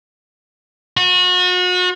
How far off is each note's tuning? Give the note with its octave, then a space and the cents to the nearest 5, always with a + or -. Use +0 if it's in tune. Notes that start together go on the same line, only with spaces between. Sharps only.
F#4 -35